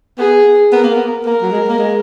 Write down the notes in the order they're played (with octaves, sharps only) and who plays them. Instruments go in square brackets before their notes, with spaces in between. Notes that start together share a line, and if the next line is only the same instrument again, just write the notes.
[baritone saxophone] B3 [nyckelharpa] G#4
[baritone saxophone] B3 [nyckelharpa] A#4
[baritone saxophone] A#3
B3
[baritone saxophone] A#3 [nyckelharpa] A#4
[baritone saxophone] F#3
G#3
A#3
G#3